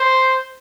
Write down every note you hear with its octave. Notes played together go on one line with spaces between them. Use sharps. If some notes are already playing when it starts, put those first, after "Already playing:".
Already playing: C5